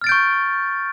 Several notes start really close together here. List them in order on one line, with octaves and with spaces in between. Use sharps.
F6 A6 D7 G6 C#6